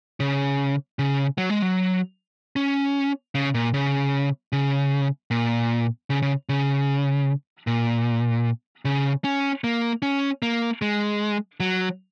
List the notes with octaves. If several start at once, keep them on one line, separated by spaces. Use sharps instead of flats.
C#3
C#3
F#3
G#3
F#3
C#4
C#3
A#2
C#3
C#3
A#2
C#3
C#3
C#3
A#2
C#3
C#4
A#3
C#4
A#3
G#3
F#3